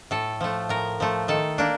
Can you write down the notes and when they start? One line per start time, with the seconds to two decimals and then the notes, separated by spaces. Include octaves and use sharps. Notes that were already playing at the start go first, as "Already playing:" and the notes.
0.11 A2 A4
0.41 F3 A3
0.69 A2 A#4
1.00 F3 A3
1.28 D#3 A4
1.58 A#3 D4